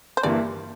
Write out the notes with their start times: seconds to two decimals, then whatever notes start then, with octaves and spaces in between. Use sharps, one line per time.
0.17 C5
0.23 G2 E3 A#3 E4 D5